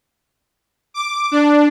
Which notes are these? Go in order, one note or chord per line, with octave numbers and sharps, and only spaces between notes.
D6
D4